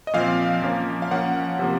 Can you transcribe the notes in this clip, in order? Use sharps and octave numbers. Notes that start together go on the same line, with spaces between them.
D#5
A#2 F3 C4 F5
F3 A#3 C#4
F5
F3 A#3 C#4 F#5
C3 F3 A#3